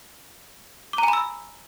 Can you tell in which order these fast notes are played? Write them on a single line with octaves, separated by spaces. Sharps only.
D6 A#5 G#5 B5 E6